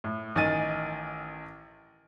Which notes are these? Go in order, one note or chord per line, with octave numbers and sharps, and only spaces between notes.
A2
A1 D#3 D#4 G#5 A6 D#7